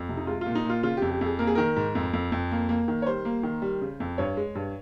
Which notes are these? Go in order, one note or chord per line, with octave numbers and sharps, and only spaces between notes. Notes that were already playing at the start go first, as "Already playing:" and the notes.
Already playing: F2
C3
D#4
G#3 F4
A#2 F4
D#4
A#2 F4
C#3 F4
F2 G4
G4
F2 G#4
A#3 A#4
G#4
D#3 A#4
G#2
F2
F2
F2
A#3
A#3
D#3
C#5
G3 C5
A#3
D#3
G3
C#3
F2
G2 C#5
G#3
G2